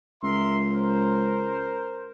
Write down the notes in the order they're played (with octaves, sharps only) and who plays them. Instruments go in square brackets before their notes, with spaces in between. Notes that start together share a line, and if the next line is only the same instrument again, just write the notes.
[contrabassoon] C#2 [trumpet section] A#4 E5 C6
[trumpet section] A#4 C5